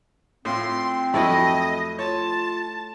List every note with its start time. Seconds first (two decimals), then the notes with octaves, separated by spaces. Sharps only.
0.45 A2 C4 F4 C6
1.14 F2 F#3 A3 E4 D#5 B5
1.99 F4 C#5 A5